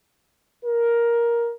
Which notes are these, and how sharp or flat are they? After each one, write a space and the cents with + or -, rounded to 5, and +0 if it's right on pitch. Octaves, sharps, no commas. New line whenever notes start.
A#4 +10